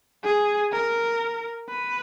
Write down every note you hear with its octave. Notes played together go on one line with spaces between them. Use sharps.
G#4
A#4
B4